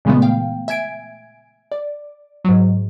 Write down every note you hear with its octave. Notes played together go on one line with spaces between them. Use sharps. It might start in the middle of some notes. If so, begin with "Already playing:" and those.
A#2 C#3 E3 G#3 A3 B3
F5 G5
E5 G#5 G#6 D7
D5
G#2 F#3